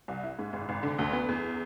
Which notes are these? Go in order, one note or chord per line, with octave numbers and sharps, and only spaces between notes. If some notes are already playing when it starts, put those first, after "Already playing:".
C2
E4
G#2
G#1
G#1
D3
D2
B3
E2